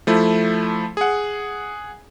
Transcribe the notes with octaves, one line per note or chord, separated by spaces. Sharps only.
F3 A3 E4
G#4 F#5